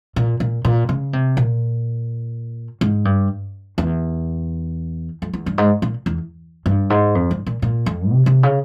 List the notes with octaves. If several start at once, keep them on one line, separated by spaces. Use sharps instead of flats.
A#2
A#2
A#2
C#3
C3
A#2
G#2
G2
E2
F2
E2
G2
G#2
A#2
E2
G2
G#2
F2
G2
A#2
A#2
F2
C3
C3
C#3